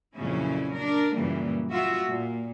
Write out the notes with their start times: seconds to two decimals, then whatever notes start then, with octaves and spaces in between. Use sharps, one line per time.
0.15 F2 A#2 C#3 F#3 C#4 E4
0.74 D4 A#4
1.15 F#2 A#2 C#3 E3 G3 A#3
1.71 F4 F#4 E5
2.07 A#2